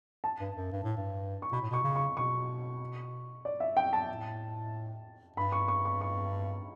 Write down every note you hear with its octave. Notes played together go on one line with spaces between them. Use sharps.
A5
G2
F#2
G2
A2
G2
C#6
B2 B5
A2
B2 C#6
C#3
C#6
B2 C#6
D5
E5
G5
A5
A2
G2 B5
C#6
C#6
C#6
C#6